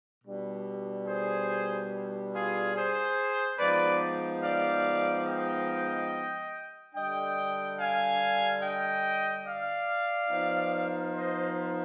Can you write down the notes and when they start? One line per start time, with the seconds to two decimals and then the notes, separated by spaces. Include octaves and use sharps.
0.24 B2 G3 D4
1.07 G#4 C5
2.33 F4 G#4
2.75 G#4 C5
3.59 F3 G#3 B3 D#4 B4 D5
4.43 D5 F5
5.27 D#5 G5
6.94 D3 G3 D4 D#5 G5
7.78 F5 G#5
8.62 D#5 G5
9.45 D5 F5
10.29 F3 B3 D#4
11.13 C5 D#5